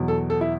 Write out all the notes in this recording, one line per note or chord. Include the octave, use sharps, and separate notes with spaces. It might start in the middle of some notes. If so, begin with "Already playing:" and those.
Already playing: E2 B2 F#3
A4
A4
E4